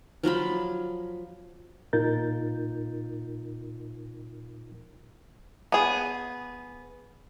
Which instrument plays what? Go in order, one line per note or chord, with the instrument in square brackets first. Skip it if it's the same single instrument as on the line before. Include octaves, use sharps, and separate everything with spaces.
[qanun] F3 F#3 F4 B5
[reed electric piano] A#2 D#4 F4 A#4 G6 A6
[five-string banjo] B3 G#4